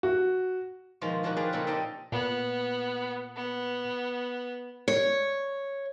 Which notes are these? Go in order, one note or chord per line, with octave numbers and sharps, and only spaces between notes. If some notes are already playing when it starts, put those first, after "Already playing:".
F#4
B2 D#3 F3 G#3 F4
A#2 D#3 F3 D4 F#4
G#4 B4 C5 D5 F5 G5
A#2 C#3 C4 D#4 A4 B5
D#4 G4 A4 C5 D5 D#5
A#2 B3
B3
C#5